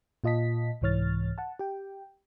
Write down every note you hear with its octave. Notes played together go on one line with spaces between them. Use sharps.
A#2 F4 D#5 A5 B6
C2 G#2 E3 C#5 F6 A6
F#5 A5
G4 G5